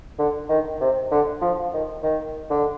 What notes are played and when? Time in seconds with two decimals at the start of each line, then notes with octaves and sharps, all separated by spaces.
0.19 D3
0.49 D#3
0.81 C3
1.11 D3
1.42 F3
1.73 D#3
2.03 D#3
2.50 D3